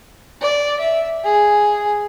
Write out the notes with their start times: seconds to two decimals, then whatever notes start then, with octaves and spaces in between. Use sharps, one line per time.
0.42 D5
0.79 E5
1.24 G#4